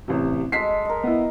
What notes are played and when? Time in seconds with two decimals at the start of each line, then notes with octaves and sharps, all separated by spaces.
0.08 A1 C3
0.52 G#3 A4 B6 C7
0.85 A#4 D#5
1.03 B3 E4